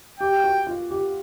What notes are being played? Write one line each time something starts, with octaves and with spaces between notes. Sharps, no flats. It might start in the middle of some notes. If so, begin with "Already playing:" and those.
G4 G5
F#4
F4
G4